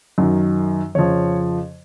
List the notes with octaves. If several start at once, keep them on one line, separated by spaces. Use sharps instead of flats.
F#2 D#3 F#3
F2 C#3 F3 C#5